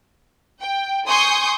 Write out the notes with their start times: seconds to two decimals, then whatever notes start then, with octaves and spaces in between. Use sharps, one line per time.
0.61 G5
1.07 G#5 C6 C#6 D#6 G6